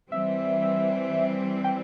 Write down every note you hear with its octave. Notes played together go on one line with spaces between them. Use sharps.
E3 G3 C4 E5
G5